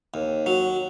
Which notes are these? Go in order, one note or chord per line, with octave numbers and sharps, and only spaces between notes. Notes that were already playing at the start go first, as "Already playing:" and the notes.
D#2
F#3